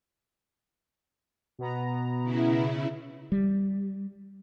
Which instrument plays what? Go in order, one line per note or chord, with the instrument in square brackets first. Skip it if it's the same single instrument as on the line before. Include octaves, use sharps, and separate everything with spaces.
[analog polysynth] B2 B3 A#5
[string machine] C#3 E4
[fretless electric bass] G3